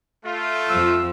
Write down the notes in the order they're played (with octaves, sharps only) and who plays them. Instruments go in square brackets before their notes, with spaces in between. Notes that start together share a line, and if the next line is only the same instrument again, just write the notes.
[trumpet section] A3 F4
[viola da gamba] F2 F3 [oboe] E6